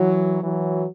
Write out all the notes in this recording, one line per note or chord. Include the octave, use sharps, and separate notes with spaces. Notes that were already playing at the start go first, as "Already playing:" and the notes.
Already playing: E3 F#3
E3 F#3